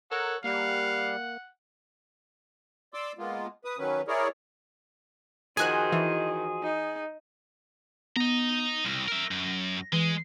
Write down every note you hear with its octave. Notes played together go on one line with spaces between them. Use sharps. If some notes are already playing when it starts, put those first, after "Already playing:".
A4 A#4 C#5 F#5
G3 A#3 F5 F#5
D5 C6 D6 E6
G#3 A#3 B3 F4
B4 D#6
D#3 F#3 C#4 B4
E4 G#4 A#4 C#5 D5
D#3 F3 F#4 G#4 C5 G#5 F#6
E3
D#4
B3 D#5 A#5
C2 A#6
A#4 E5
F#2
E3 G#3